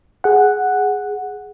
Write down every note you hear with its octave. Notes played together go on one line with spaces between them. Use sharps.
G#4 F#5